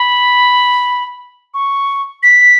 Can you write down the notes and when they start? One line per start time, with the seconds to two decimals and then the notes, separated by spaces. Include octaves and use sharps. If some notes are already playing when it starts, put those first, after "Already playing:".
Already playing: B5
1.54 C#6
2.23 B6